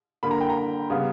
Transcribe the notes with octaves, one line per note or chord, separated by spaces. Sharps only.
D3 A#3 B5
A#5
G5
A#5
C#3 G3 B3